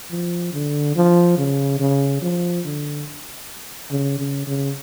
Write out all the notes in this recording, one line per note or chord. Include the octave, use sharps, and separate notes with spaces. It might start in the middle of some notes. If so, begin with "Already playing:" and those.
F3
D3
F3
C#3
C#3
F3
D3
C#3
C#3
C#3